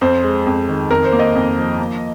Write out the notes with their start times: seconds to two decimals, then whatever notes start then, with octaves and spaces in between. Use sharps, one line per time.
0.01 F2 C5
0.23 G#3
0.46 F2
0.69 D#3
0.90 F2 A#4
1.05 C5
1.12 A#3
1.19 D#5
1.35 F2
1.57 F3
1.80 A#3